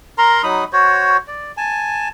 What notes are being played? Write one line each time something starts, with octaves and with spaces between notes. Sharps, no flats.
A#4 A#5 C6
F#3 D#4 B5 D#6
F#4 C5 C#5
D5
G#5 A5